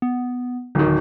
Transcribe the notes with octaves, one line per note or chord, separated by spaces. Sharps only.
B3
D1 D3 D#3